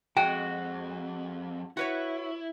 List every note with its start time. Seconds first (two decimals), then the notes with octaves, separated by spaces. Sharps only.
0.17 F2 G#3 F#4 G5
1.77 E4 F#4 B4 C#5